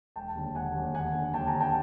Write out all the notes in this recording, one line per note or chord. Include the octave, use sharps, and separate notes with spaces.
E1 G5 A5
D#2 D3
E1 F#5 G#5
D#2 D3
D#2 F#5 G#5
D3
D#2 G5 A5
G#5 A#5
D3
G5 A5